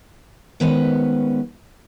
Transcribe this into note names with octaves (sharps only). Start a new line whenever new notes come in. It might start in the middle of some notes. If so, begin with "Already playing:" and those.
D#3 G#3 B3 C#4 B4 C5